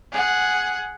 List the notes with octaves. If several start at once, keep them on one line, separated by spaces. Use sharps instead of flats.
G#4 F#5